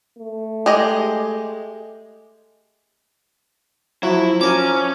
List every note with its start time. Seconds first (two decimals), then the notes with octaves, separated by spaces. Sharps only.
0.18 A3
0.66 G#3 G4 D#5
4.03 F3 F#3 E4
4.41 C#4 A#4 D6